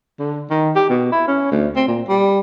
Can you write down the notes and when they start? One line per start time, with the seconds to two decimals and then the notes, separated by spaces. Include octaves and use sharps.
0.19 D3
0.50 D#3
0.76 G4
0.90 B2
1.12 E4
1.27 C#4
1.51 D2
1.76 C4
1.88 A#2
2.09 G3